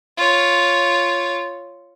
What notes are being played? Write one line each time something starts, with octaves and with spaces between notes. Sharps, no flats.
F4 C#5